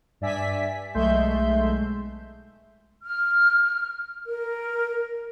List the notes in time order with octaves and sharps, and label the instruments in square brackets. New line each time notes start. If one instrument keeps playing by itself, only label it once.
[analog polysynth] G2 D5 E5 G#5 B6
B1 G#3 A3 E5 C6 G6
[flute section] F6
A#4